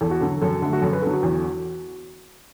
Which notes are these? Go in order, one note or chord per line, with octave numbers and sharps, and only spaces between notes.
E2 A4
F#4
D3 F#3 A4
F#2 A4
D3 A3
F#4
F#2 A4
B4
D3 F#3 A4
F#4
E2